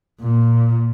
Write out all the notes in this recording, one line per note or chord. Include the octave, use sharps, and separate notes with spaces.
A#2